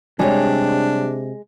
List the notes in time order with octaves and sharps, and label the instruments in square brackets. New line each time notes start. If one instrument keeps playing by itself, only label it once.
[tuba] C3 [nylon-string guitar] G3 G4 C#5 [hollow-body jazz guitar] G#3 G#4 [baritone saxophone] D4